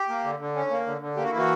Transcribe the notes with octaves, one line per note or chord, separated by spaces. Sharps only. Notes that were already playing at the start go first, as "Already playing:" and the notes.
Already playing: G4
A#3
D3
D3
C#4
A#3
D3
D3
A#3 G4
F#4
E3 E4
F#4